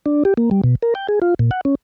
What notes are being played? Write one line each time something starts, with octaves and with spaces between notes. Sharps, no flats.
D4
G4
A#3
G3
B2
A#4
G5
G#4
F4
A#2
F#5
C#4